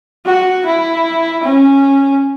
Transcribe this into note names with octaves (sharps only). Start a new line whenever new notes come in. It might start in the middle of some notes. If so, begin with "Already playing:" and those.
F#4
E4
C#4